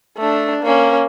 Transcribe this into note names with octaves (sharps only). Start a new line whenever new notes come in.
A3 D4
A#3 C#4